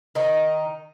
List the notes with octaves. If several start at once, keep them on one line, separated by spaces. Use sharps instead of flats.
D#3 D#4